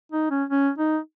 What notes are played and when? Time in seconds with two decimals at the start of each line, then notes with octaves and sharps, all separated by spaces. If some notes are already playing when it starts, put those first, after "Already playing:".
0.12 D#4
0.30 C#4
0.50 C#4
0.78 D#4